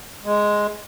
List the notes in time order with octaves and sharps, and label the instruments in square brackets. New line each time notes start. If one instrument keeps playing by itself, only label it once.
[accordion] G#3